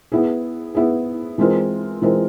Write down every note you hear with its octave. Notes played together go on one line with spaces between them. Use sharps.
B3 E4 G#4
B3 E4 G#4
E3 G#3 C4 F4 A#4
E3 G#3 C4 F4 A#4